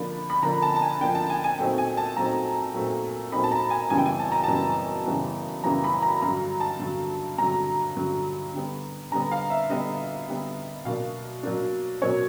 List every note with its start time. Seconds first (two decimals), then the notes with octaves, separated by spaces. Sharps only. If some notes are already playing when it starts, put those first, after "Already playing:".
Already playing: D3 F3 A#3 D4 B5
0.30 B5
0.42 D3 F3 A#3 D4 A#5
0.62 A5
0.76 A5
0.82 G#5
1.01 D3 F3 A#3 D4 G5
1.15 A5
1.30 G#5
1.44 G#5
1.58 A#2 F#3 A3 C4 D#4 G5
1.78 G#5
1.97 A5
2.16 A#2 F#3 A3 C4 D#4 A#5
2.74 A#2 F#3 A3 C4 D#4
3.32 A#2 F#3 A3 C4 D#4 B5
3.44 A5
3.51 A#5
3.70 G#5
3.90 F#2 C#3 E3 G3 B3 G#5
3.98 G5
4.06 G#5
4.20 A5
4.32 A#5
4.44 F#2 C#3 E3 G3 B3 A5
5.06 F#2 C#3 E3 G3 B3
5.64 F#2 C#3 E3 G3 B3 A#5
5.84 B5
6.02 A#5
6.22 G2 D3 F#3 A#5
6.60 A5
6.79 G2 D3 F#3
7.38 G2 D3 F#3 A#5
7.96 G2 D3 F#3
8.53 D3 G3 B3
9.11 D3 G3 B3 A#5
9.31 F5
9.50 E5
9.69 D3 G3 B3 D#5
10.28 D3 G3 B3
10.85 B2 F#3 A#3 D4 F5
11.43 B2 F#3 A#3 D4
12.01 B2 F#3 A#3 D4 C#5